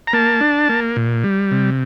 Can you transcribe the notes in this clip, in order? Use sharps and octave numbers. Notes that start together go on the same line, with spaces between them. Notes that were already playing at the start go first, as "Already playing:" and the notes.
A#5
A#3 A5
D4
A#3
A#2
G3
C3